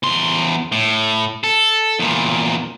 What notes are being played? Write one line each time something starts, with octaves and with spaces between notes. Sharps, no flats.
E2 C6
A2
A4
E2 A#2